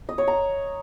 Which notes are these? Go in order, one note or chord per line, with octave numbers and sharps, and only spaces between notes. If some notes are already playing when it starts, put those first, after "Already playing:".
D#5
C#5
A#5